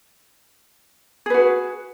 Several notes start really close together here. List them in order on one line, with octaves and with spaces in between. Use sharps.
G#4 B4 F#4